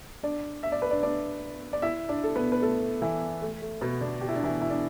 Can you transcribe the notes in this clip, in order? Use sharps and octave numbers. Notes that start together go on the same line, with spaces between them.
D4 D5
E5
D5
B4
D4 D5
D4 D5
D5
E4 E5
D4 D5
A4
B3 B4
B4
A3 A4
E3 E4
A3
A3
B2 B3
D3 D4
G4
E4
D4
E3 E4
E4
D4